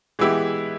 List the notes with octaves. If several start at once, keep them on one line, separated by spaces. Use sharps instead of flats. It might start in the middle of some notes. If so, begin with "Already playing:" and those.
E3 G#3 B3 E4 G4